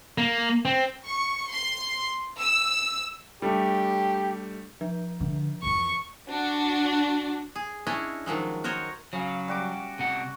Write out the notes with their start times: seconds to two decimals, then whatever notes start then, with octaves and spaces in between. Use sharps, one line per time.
0.18 A#3
0.65 C4
1.05 C#6
1.50 C6
2.38 E6
3.42 G3 A3 D4 G4
4.81 F3
5.20 D3
5.63 F2 E3 C#6
6.28 D4 F#4
7.56 G#4
7.87 C#4 D4 E4 C#5 D#5
8.26 D#3 F3 F#3 G#3
8.64 F#4 A#4 C5 C#5 D#5
9.13 C#3 F#3 F5
9.48 G3 F#4 D6
9.99 C3 F#5